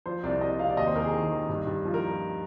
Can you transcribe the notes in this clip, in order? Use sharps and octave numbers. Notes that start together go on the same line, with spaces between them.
F3 C5
C2 D5
C2 D#5
C3 F5
D5
D#2 D#5
C5
D#2 A#4
G#4
D#3
D#3
G2
G2
F3
A#4